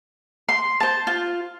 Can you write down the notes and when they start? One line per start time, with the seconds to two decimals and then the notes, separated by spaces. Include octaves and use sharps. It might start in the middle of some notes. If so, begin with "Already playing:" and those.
0.49 C6
0.80 C5 A5
1.07 F4